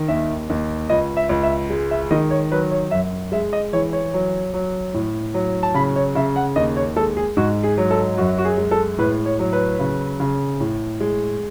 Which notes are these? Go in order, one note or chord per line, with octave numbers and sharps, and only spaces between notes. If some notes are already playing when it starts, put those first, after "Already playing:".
Already playing: D#3
D#2 E5
D#2
C#2 D#5
E5
C#2
E5
G#3
E5
D#3 D#5
C#5
F#3 B4
C#5
F#2 E5
G#3 E5
D#5
E3 C#5
C#5
F#3
F#3
A2
F#3
A5
C#3 B5
C#5
C#3 E5
F#5
D#2 D#5
C#5
G#3 A4
G#4
G#2 F#4
G#4
F#3
A4
F#2 F#4
F#4
G#4
G#3
A4
A2 B4
C#5
F#3
B4
C#3
C#3
A2
G#3